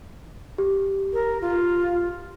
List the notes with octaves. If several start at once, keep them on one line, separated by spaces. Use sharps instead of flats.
G4
A#4
F4